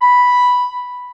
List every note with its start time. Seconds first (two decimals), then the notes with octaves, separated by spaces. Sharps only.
0.02 B5